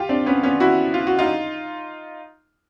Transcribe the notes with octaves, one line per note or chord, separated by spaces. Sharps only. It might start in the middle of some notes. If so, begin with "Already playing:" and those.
Already playing: F4 G4
C4 D4
B3 C#4
B3 C#4
E4 F#4
F4
F#4
D#4 F4